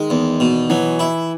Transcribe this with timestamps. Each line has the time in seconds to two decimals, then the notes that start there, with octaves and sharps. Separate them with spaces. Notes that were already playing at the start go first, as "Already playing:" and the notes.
Already playing: D#3 G#3
0.10 E2
0.40 B2
0.70 E3 F#3
1.00 E4